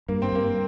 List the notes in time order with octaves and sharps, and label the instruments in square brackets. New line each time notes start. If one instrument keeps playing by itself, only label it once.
[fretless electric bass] G2 [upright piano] A#3
[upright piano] C4
[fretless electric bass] G2 [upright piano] A#3